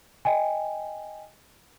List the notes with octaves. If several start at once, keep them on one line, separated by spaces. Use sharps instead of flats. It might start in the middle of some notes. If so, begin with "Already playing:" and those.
D#5 G5 G#5